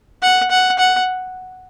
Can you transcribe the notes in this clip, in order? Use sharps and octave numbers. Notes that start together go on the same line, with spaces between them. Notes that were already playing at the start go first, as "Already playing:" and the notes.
F#5
F#5
F#5